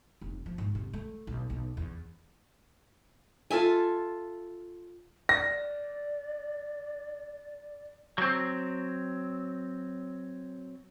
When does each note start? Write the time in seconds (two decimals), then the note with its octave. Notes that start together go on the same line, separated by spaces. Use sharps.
0.21 F1
0.46 F3
0.58 G#2
0.75 C3
0.93 A3
1.27 B1
1.50 B1
1.77 E2
3.50 F4 A4 E5 G#5
5.29 D5 A#6
8.18 F#3 C4